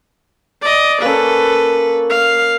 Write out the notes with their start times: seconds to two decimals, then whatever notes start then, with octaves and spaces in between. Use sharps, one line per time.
0.62 D5 D#5
1.02 A#3 C#4 A4 B4
2.10 F5